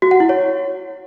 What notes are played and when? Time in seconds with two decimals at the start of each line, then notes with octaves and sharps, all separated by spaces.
0.02 F#4
0.11 F#5
0.20 E4
0.29 C#5